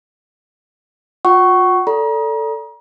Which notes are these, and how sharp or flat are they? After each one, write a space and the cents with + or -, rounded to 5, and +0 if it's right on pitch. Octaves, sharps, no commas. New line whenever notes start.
F4 +40 F#5 +35 C#6 +0
A4 +10 D5 -25 A#5 +35